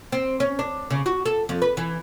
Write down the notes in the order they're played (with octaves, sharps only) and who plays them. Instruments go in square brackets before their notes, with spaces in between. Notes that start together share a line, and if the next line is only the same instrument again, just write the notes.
[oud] C4
C#4
D4
C#3
F#4
A4
F2
B4
E3